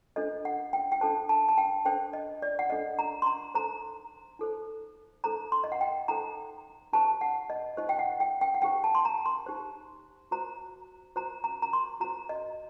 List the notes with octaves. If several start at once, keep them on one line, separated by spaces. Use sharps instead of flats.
D4 A4 C5 D#5
F#5
G5
G5
D4 A4 C5 A5
A5
A5
G5
D4 A4 C5 G5
D#5
D5
F#5
D4 A4 C5 D#5
A#5
C6
A#5
D#4 A4 C5 A#5
D#4 A4 C5
D#4 A4 C5 A#5
C6
D#5
F#5
G5
D#4 A4 C5 A#5
D#4 G4 C5 A5
F#5
D#5
D#4 G4 C5 D#5
G5
F#5
G5
G5
F#5
D#4 G4 C5 G5
A5
C6
A#5
C6
D#4 G4 C5
F#4 C5 A#5
F#4 C5 A#5
A#5
A#5
C6
F#4 C5 A#5
D#5